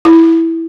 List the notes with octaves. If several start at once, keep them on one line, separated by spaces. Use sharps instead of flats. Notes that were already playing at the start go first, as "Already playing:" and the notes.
E4